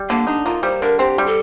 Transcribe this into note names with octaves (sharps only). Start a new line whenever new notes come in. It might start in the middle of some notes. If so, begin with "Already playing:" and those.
Already playing: G3
D3 A#3
D4 D#4
A#3 F4
G3 C5
D3 A#4
C4 G4
G3
A4